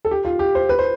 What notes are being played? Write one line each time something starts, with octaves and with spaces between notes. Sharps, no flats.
A4
G4
F4
G4
C5
B4
C5